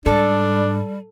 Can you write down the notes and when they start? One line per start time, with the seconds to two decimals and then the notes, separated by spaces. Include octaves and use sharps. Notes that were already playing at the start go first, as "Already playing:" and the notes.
0.06 G#2 G3 D4 A4